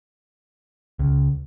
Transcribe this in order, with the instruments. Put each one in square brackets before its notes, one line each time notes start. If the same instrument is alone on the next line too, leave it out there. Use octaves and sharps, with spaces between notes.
[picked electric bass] C#2